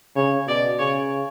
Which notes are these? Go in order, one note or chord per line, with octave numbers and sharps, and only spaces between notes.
C#3 C#5
B2 D5
C#3 C#5